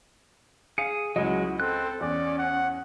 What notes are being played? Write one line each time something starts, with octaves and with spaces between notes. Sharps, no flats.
G#4 F5 C#7
C#2 F#3 G#3 E4 F#4 D#5
C4 A4 F#6
E2 C#4 D5
F#5